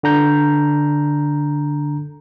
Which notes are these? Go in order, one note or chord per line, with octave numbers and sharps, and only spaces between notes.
D3 D4 A#5 G6